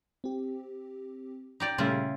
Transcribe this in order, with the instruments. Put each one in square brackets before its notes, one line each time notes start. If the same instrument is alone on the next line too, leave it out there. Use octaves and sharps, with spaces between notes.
[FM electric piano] C4 G4
[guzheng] D#4 G4 D5
[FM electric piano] A#2 G3 A3 [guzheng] C#3 E4 F4